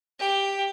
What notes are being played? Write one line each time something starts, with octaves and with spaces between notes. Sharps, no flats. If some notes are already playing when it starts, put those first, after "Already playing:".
G4